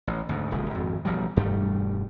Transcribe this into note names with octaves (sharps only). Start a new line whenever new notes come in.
A1
D2 G#2
D#1 A#1 C#3 G#3
G#1 F2
A1 B2 F3 G3
E1 G2 G3 A3